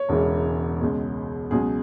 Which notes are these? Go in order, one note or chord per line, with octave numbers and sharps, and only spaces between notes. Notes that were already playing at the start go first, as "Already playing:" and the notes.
Already playing: C#5
E1 E2 C#3 E3 G#3
C#2 B2 G#3
C#2 B2 F#3 G#4